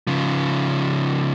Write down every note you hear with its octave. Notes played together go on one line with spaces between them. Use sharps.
C#3 F3